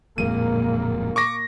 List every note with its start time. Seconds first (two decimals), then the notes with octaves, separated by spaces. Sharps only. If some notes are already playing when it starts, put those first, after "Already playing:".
0.18 D1 F2 A#2 G#3 A#3 D#7
1.16 C#6 D6 A#6